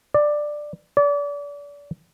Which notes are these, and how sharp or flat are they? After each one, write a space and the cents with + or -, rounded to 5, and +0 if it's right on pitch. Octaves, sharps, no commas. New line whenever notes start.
D5 +10
D5 -35